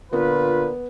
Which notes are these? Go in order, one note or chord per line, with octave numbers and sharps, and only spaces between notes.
A#2 D3 B3 F4 B4